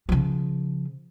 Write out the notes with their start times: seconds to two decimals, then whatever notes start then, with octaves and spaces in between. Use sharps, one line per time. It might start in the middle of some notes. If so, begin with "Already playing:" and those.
0.09 C#3 F3